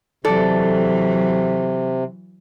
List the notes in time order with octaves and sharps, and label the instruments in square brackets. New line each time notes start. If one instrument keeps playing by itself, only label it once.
[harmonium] C3 [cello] E3 F#3 [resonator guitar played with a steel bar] A4 D5